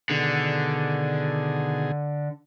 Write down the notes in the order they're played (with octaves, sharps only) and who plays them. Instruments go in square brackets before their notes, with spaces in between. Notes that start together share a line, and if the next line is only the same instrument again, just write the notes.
[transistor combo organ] B2 D#3 G#4 [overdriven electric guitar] D3